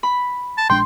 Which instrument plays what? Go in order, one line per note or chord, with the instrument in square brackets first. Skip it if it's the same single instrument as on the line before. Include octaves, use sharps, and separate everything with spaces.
[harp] B5
[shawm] A5
[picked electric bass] A#1 G#3 D4 [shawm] G5 [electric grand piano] C6